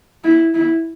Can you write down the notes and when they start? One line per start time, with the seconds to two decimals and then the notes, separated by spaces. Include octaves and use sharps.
0.24 E4
0.54 E4